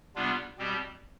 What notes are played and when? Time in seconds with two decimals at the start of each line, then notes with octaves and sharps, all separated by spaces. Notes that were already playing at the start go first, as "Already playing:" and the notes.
0.15 C3 G3 B3 D4 F4
0.58 B2 G3 C4 G4